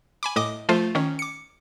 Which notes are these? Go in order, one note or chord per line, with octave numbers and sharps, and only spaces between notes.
G#5 B5 D6
A2 D#5 D6 D#6
F3 A3 F4 C5
D#3 C#4
D6 C#7